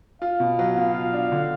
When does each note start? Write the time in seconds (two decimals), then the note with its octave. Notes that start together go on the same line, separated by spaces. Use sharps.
0.22 F4 F5
0.40 B2
0.59 F#3
0.77 B2 F5
0.94 F4
1.13 D4
1.32 D3